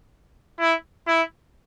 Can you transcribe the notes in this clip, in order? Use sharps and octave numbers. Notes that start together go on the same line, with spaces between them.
E4
E4